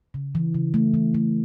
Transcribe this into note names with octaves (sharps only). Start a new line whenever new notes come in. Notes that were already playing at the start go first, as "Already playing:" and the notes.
C#3
E3
C#3
A3
E3
A3